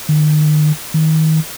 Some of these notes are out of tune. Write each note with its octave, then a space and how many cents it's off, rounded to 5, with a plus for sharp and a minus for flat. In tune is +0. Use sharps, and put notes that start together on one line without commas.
D#3 -40
D#3 +25